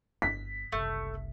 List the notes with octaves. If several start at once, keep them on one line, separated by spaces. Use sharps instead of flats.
G1 B6
F#1 C2 A3